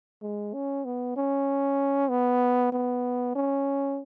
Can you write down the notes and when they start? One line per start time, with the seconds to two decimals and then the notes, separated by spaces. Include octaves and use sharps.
0.22 G#3
0.54 C#4
0.85 B3
1.16 C#4
2.10 B3
2.72 B3
3.36 C#4